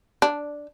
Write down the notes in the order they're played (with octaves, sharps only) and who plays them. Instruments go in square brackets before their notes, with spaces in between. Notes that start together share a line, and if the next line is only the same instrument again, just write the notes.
[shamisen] D4